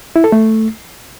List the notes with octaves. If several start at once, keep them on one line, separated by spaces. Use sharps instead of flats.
E4
A4
A3